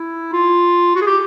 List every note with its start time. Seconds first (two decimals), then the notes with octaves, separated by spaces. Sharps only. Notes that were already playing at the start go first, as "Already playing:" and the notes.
Already playing: E4
0.33 F4
0.96 F#4
1.01 G#4
1.06 G4